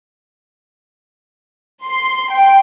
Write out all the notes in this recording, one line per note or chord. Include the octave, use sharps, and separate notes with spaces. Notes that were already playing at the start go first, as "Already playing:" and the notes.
C6
G5